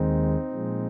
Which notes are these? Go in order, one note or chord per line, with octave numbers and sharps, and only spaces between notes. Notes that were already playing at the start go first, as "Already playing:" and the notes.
Already playing: D#2 D#3 G#3 C4 D#4
A#2 F3 G#3